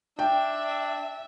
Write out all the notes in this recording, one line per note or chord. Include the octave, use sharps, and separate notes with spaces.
D4 E5 G5